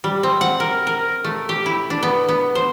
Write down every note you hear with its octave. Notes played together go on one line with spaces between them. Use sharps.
G3
C4
F#5
A#4
A#4
A3
G4
E4
D4
B3
B3
C5